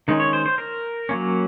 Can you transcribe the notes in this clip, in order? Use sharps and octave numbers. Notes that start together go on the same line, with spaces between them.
D#3 G#3 C#4 D#4
C#5
C5
C5
A#4
F#3 A#3 C#4